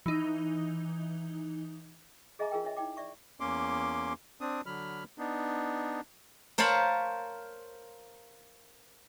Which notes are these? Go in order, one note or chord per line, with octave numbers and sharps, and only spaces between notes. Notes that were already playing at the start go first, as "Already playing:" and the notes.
E3 D#4
G#4 D#5 E5 G#5 A#5 D6
F4 G#4 A#4 G5
D4 C#5 D#5 E5
D#4 E4 G5 D6
D5 E5 C#6
E2 A#3 C#4 C6 D6
C4 D4 D#6
D3 F#3 B5 F6
B3 D4 D#4
A#4 C5 C#5 F5 A5 B5